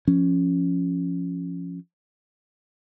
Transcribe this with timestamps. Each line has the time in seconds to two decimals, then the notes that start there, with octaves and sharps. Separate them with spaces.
0.07 F3 C#4